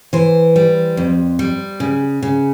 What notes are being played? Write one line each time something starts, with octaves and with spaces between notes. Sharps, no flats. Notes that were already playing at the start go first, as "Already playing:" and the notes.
E3 C5
G3
F2
G3
C#3
C#3